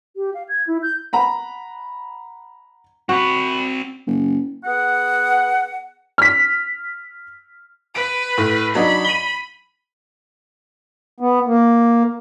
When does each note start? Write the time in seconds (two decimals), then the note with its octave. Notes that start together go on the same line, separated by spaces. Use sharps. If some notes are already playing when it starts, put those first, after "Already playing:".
0.16 G4
0.34 F5
0.49 G#6
0.67 E4
0.83 G6
1.13 F#5 A#5 B5
3.09 C4 F#4 B5
4.07 F#1
4.65 B3 G#4 F#5
6.18 F6 B6
7.95 B4 D7
8.38 A2
8.75 F#3 D4 D#4 B5
9.05 D#7 G7
11.20 B3
11.47 A#3